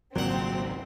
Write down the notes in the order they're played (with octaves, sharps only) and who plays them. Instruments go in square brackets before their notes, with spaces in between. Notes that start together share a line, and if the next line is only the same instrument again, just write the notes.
[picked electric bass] G#1 C#2 [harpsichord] A#2 F#5 [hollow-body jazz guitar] F#3 [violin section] C4